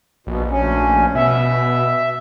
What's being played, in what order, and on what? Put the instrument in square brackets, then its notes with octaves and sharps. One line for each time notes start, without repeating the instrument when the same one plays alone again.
[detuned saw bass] A#1 [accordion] B2
[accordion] D2 C#4
[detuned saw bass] B2 [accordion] E5